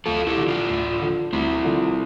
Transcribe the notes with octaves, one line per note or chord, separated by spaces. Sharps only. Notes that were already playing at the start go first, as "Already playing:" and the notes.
D2 F4 A4
E4 G4
D3 F3
D4 F4
D2
D3 F3
D2 C4 E4
D3 F3